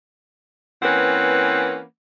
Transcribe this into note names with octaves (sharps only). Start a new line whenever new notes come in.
E3 A#3 C4 C#4 B4 F#5